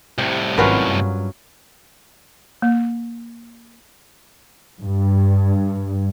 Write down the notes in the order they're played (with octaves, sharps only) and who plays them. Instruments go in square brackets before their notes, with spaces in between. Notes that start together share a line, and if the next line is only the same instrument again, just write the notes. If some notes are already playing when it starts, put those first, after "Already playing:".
[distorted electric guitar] C2 A2 [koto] C3
[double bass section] G#1 [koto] F#3 C#4 F4 [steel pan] A#4 B4 A#5
[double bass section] G2
[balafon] A#3
[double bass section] G2